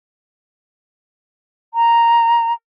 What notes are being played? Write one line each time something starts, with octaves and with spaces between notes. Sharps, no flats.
A#5